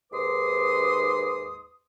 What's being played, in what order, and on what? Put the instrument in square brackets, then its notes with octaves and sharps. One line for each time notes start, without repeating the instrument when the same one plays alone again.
[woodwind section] D#2 G#2 B4 C6 D6 D#6